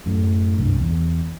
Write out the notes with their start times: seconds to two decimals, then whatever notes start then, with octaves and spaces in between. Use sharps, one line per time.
0.06 F#2 A2
0.58 C2 G2
0.79 E2